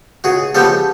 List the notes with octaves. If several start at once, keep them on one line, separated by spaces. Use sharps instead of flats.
C#2 F#4 G#4
C#3 F3 G#3 B3 G4 A4